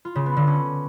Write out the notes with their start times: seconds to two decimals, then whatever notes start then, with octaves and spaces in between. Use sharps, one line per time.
0.05 F4
0.15 C#3
0.26 B3
0.37 D3
0.47 C#4